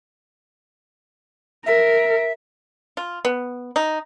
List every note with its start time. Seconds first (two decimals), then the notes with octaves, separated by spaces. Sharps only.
1.66 A#4 E5
2.97 F4
3.25 B3
3.76 D#4